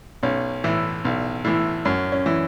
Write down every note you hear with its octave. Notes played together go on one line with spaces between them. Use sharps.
B1 C#4
A2 E3
B1
A2 E3
F#2 C#4
C#4
E3